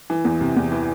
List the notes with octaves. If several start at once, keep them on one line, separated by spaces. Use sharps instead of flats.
E3
E2
C3
E2
E3